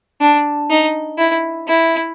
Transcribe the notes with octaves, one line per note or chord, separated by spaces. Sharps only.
D4
D#4
E4
E4